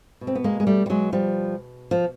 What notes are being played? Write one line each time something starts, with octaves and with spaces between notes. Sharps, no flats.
B2
C4
B3
G#3 A#3
G#3
G3 A3
G3
F#3 G#3
F3 G3
F3